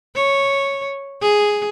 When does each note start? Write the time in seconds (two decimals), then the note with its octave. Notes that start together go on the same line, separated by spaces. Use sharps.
0.16 C#5
1.22 G#4